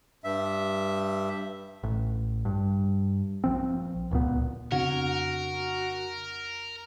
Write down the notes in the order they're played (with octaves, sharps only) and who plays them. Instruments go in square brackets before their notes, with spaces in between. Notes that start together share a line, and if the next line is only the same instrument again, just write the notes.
[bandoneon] G2 E5
[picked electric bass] A1
G2
A#1 F3 C4
D1 C#2 A#2 B3
[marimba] F2 [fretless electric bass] C#3 C4 [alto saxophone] F#4 [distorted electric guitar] A#4